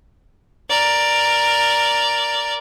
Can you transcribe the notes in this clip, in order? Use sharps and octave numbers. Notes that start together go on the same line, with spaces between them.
A#4 D5